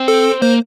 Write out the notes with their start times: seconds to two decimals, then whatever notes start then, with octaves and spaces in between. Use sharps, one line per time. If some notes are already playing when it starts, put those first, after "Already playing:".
Already playing: C4
0.08 A4
0.42 A#3 C5